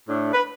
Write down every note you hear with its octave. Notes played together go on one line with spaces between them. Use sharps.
A2 A3 D4
B4